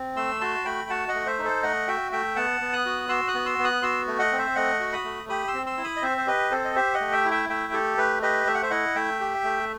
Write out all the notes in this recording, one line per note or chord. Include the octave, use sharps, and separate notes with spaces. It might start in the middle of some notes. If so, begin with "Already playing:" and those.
Already playing: C4
A3 C6 E6
F#4 A5 C6
A3 G5 B5
F#4 F#5 A5
D#5 F#5
A3
C5 E5
D#4
A4 C5
A3 D#5 F#5
F#4 E5 G5
A3 E5 G5
B3 F#5 A5
B3
D#6 F#6
F#4
F#4 C6 E6
D#6 F#6
B3
C6 E6
B3
D#6 F#6
F#4 C6 E6
A3
D#5 F#5
C4
C5 E5
A3 D#5 F#5
F#4
B5 D#6
A3
G4 B5 D#6
C6 E6
C4
C6 E6
E4
B5 D#6
D#5
C4 C5 E5
C5
G4 B4 D#5
C4 A4 C5
D#5
G4 C5 E5
D#5 F#5
A3
E5 G5
E4
E5 G5
A3 E5 G5
G4 A4
A3 B4
G4 B4 D#5
A3 E5
F#5
C5 E5
E4 D#5 F#5
A3 E5 G5
G4
A3